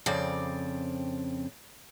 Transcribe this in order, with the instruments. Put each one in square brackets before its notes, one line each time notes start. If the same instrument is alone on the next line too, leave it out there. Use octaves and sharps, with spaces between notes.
[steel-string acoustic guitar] F2 C#3 C4 D5